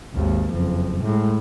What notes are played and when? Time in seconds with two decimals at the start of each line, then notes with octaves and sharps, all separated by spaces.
0.15 G#1 D#2
0.52 F#1 F2
1.03 A2 G#3